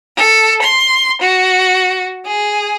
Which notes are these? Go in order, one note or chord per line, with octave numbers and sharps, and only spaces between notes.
A4
C6
F#4
G#4